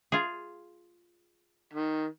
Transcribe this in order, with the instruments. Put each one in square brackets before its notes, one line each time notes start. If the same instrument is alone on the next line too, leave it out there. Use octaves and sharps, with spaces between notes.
[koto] F4 G#4
[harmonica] D#3